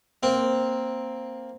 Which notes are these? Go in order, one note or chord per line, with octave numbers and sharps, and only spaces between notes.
A#3 C4